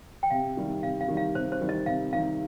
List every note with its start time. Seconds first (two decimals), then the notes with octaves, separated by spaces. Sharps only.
0.23 G5
0.30 C3 F5
0.57 D#3 G3
0.83 C3 F5
1.01 F5
1.08 D#3 G3
1.17 F5
1.35 C3 C5
1.52 C5
1.61 D#3 G3
1.69 D#5
1.86 C3 F5
2.13 D#3 G3 F5